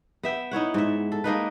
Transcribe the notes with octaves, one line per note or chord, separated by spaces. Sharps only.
B3 E5 G5
D#4 E4 C#5 F#5
G#2 E5
A4
G#3 A#3 D#4 B4